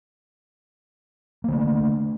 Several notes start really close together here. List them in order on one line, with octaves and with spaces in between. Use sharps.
A#3 D3 A3